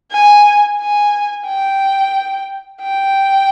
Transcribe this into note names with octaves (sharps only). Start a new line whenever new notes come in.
G#5
G#5
G5
G5